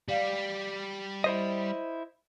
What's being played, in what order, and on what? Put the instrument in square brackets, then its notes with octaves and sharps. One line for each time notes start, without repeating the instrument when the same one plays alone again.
[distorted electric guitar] G3 [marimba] D5 F5
[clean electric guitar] E4 C5 D#5